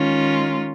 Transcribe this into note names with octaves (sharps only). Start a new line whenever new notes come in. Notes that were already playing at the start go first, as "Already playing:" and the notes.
Already playing: D#3 G#3 C#4 F4